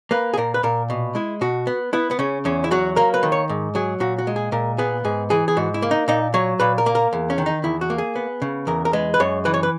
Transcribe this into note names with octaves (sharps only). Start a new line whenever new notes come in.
A#3 B4
G#4
A#2 A#4
B4
A#2 A#4
B2
G#3 E4
B2 F#4
B3
B3 E4
B3
C#3 C#4
E2 C#4
E4
F#3 F#4
A#3 A#4
B4
D#3
C#5
G#2
F#3 G#4
A#2 F#4
F#4
G#3
G#4
A#2 A#4
B3 G#4
G#2 G#4
E3 G#4
G#4
G#2 F#4
E4
A#3
D#4
A#2 D#4
F#3 C#5
A#2 B4
A#4
A#3
A#4
E2
C#4
D#3
D#4
E2 E4
F#4
A#3
G#4
B3
C#3
E2 A#4
A#4
G#3 B4
B4
F#2 C#5
E3 B4
C#5
B4